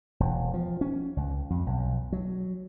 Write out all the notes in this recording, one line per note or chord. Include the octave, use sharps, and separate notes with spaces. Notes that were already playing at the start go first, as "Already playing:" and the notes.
E1
F3
C#4
C#2
F2
B1
F#3